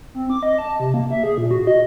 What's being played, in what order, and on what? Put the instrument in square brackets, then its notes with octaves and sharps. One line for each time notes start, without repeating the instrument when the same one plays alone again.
[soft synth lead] C4
D6
D#5
A5
C3
A#3
E5
G#4
A#2
F#4
D#5